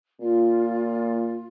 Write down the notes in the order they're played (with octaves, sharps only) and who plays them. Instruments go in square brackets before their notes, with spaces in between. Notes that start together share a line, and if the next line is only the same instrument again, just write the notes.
[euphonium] A#2 [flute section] F4